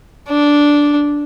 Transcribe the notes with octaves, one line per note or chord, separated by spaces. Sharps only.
D4